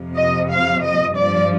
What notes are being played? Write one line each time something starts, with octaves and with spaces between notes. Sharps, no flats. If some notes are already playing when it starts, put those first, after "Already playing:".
Already playing: F2 C3 F3
D#5
F5
D#5
G2 F3 D5